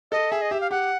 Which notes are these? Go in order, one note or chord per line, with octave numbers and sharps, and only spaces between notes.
A4 D#5
G#4 E5
D#5
G4 E5
F5
G4 F#5